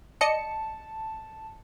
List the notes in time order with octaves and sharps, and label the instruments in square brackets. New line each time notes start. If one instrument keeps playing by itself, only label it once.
[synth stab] D5 D#5 C#7 [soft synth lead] A5